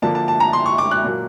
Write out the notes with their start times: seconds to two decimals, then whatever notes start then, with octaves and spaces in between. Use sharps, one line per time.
0.02 D3 F3 A#3 D4 A5
0.15 A5
0.28 A5
0.40 A#5
0.53 C6
0.66 C#6
0.78 D6
0.91 F#6
1.04 A#2 F#3 A#3